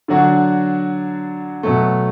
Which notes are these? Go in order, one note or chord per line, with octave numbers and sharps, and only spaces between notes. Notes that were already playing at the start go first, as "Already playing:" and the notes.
D3 F#3 D4 F#4
B2 F#3 A3